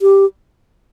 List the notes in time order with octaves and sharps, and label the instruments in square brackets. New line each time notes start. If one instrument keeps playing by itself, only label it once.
[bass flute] G4